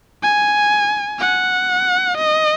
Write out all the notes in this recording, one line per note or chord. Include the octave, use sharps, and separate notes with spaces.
G#5
F#5
D#5